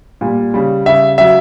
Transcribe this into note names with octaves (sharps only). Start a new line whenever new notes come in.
A#2 G3
C#3 G3
C#3 G3 E5
C#3 F#3 E5